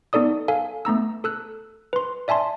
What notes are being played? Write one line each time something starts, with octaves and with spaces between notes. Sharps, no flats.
B3 D#4 A4 D5 D#6
A4 F5 G#5
A3 B3 A#5 E6
A4 E6 F#6
B4 C6
D5 E5 G#5 A5 C6